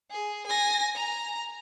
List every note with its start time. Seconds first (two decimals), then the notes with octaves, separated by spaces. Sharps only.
0.11 G#4
0.47 G#5 A#6
0.96 A#5